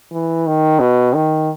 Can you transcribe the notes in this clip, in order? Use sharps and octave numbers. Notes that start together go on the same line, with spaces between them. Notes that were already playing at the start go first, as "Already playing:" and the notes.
E3
D#3
B2
D#3